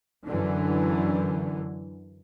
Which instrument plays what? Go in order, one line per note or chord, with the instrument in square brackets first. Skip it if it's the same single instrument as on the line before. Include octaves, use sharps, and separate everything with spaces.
[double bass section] F#2 D3 E3